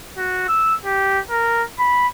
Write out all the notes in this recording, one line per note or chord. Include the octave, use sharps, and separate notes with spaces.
F#4
E6
G4
A#4
B5